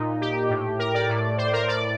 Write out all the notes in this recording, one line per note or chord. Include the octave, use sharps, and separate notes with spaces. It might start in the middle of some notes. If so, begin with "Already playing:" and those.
Already playing: A#2 D#4
G4
A2
A#4
D5
A2
C5
A#4
A2 D5